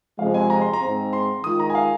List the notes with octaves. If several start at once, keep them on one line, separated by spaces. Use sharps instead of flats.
F2 C3 F3 G#3 F5
G#5
A#5
C6
A#5
G#2 G#3 C4
C6
D#3 G#3 F4 D#6
A#5
G#5
F5